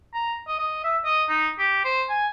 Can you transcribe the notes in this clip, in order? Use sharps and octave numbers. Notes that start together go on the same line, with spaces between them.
A#5
D#5
D#5
E5
D#5
D#4
G4
C5
G#5